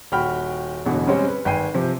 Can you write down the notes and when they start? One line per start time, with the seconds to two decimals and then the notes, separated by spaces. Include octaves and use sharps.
0.12 D#1 F#4 G5 B5 F6
0.85 E1 A1 B2 D3 E3 F#4
1.07 G3 G#3 C4 C#4 C5 C#5
1.28 B4
1.45 G#1 B4 G5 G#5 C7 D#7
1.74 C3 F3 C4